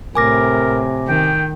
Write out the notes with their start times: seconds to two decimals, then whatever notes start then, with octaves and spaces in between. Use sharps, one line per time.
0.15 A2 C3 A#4 G#5 D6 A#6
1.08 D#3 G5